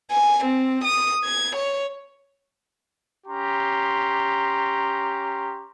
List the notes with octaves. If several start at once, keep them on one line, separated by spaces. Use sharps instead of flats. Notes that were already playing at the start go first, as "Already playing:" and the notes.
G#5
C4
D#6
G#6
C#5
C#4 G4 A#5 C6